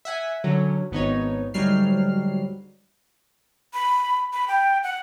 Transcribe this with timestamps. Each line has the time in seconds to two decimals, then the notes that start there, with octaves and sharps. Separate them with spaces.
0.05 E5 F#5 G#5
0.44 D3 F#3 C#4
0.91 G#1 B3 D#4 C#5
1.54 D2 G#2 F#3 G3 F6 C7
3.74 B5
4.33 B5
4.48 G5
4.83 F#5